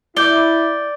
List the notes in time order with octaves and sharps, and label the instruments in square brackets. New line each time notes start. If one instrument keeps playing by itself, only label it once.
[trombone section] E4 [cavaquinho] D5 [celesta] D6 G6 G7